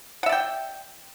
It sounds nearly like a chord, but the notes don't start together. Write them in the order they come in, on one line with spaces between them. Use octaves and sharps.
F#5 E5 D5 G5